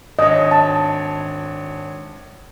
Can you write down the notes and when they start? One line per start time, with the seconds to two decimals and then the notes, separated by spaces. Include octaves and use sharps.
0.19 G#1 D4 C#5 D#5
0.51 A5